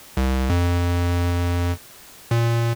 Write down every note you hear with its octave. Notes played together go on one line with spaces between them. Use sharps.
C2
F2
A#2